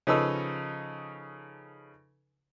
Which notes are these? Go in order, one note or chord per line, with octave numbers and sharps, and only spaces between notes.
C#3 F3 D#4 A4 B4 E6